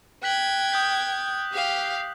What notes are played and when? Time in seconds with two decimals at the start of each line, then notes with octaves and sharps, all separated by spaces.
0.23 G5 F#6 G#6 B6 F#7
0.72 D#6 G6 B6
1.52 G4 F5